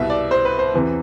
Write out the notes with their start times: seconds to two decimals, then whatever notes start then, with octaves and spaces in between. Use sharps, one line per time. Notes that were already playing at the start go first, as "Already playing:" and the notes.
Already playing: C2 B2 E5
0.10 D5
0.31 C5
0.45 B4
0.59 C5
0.74 E2 C3 E3